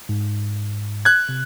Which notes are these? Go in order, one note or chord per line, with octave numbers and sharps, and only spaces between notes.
G#2
F#6 G#6
C3